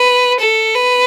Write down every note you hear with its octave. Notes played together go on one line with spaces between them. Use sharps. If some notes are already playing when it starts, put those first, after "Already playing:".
Already playing: B4
A4
B4